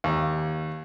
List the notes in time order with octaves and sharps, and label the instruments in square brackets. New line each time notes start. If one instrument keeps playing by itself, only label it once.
[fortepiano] D#2